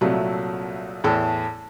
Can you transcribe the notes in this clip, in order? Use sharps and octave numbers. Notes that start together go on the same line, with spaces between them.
C2 A#2 F#3 A3
E2 A2 A4